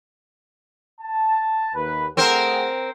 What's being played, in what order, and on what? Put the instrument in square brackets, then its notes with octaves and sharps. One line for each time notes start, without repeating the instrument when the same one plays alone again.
[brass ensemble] A5
D#2 B4
[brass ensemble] A3 G#4 F#5 [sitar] C4 A#4 C5